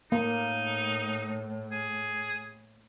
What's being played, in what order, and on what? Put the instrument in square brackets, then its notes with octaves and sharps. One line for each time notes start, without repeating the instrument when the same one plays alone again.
[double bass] A2 [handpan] A#3 [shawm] D#4
[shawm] G#4